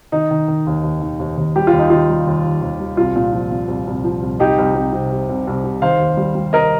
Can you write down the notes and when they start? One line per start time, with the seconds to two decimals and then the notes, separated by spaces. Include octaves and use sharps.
0.12 D#3 D#4
0.31 D#3
0.48 D#3
0.67 D#2
0.84 D#2
1.01 D#3
1.19 D#2
1.37 D#2
1.56 G3 G4
1.67 F4
1.72 D#2
1.79 D#4
1.90 D#3 F4
2.09 G3
2.27 D#2
2.44 D#3
2.62 D#2
2.80 G3
2.97 C2 F4
3.16 A#2
3.33 F3
3.51 A#2
3.68 C2
3.87 C2
4.04 F3
4.22 C2
4.39 C2 D#4 G4
4.58 C2
4.75 C2
4.93 C3
5.12 C2
5.29 C2
5.47 C2
5.64 C3
5.82 D#3 C5 F5
5.99 D#2
6.17 G3
6.35 G3
6.53 G3 A#4 D#5